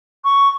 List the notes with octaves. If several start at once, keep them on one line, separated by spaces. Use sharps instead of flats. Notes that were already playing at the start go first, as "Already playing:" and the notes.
C#6